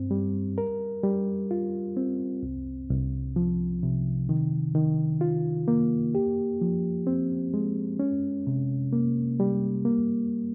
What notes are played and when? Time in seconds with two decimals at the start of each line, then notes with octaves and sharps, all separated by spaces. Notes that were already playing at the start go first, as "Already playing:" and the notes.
Already playing: G2 C4
0.11 G3
0.58 A#4
1.04 G3
1.51 F4
1.96 C4
2.43 C2
2.90 C2
3.36 F3
3.83 C3
4.29 D#3
4.75 D#3
5.21 F4
5.68 A#3
6.15 G4
6.61 F3
7.07 C4
7.54 G#3
7.99 C#4
8.47 C3
8.93 A#3
9.40 G3
9.85 A#3